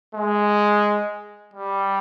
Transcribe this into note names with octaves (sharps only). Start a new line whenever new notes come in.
G#3
G3